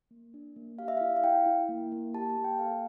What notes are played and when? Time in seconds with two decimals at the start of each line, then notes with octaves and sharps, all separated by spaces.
0.11 A#3
0.34 D4
0.56 A#3
0.79 G4 F5
0.88 E5
0.97 F5
1.01 E4
1.17 F5
1.24 E4 G5
1.46 E4
1.69 A#3
1.92 A#3
2.14 G4 A5
2.30 A5
2.37 A#3
2.44 G5
2.59 A4 F5